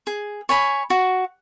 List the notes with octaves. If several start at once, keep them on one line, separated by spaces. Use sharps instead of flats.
G#4
C#5 G#5 B5
F#4